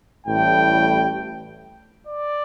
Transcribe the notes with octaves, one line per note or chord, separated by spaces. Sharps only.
A1 A2 G3 G5
D5